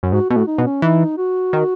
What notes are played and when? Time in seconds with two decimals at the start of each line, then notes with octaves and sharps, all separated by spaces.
0.03 F#2
0.12 G#2 F#4
0.29 B2 F#4
0.36 A2
0.47 D#4
0.58 B2
0.65 C#4
0.82 E3 D#4
1.18 F#4
1.53 D#3